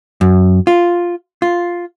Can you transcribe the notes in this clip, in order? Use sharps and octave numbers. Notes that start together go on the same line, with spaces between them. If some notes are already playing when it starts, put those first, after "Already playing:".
F#2
F4
F4